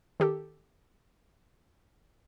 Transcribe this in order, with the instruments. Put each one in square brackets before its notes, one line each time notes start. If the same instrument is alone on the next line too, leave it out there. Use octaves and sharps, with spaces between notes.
[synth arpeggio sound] D#3 G4 A4